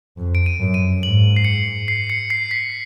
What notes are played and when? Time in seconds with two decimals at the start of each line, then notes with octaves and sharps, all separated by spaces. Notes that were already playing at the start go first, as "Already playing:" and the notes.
0.18 F2
0.35 D7
0.46 D#7
0.60 F#2
0.74 D#7
1.03 G#2 F#7
1.36 C7
1.44 C#7
1.88 C7
2.10 C#7
2.30 C7
2.51 B6